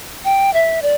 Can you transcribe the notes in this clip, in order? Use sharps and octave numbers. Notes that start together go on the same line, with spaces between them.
G5
E5
D5